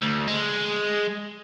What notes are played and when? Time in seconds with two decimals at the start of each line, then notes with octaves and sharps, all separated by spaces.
0.02 D2
0.28 G#3